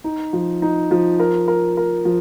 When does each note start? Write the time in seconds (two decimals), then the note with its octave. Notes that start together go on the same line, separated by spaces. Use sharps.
0.04 D#4
0.33 F3
0.62 D#4
0.91 F3
1.20 A#4
1.48 A#4
1.77 A#4
2.05 F3